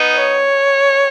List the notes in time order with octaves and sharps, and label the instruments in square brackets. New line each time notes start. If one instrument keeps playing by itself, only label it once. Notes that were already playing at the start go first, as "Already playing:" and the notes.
Already playing: [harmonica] B3 D#4
[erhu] C#5